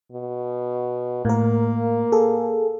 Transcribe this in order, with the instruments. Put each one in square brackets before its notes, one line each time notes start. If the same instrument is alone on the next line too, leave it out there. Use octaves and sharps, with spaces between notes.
[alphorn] B2
[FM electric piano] A2 A#4 [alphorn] A#3
[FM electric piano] G#4 A4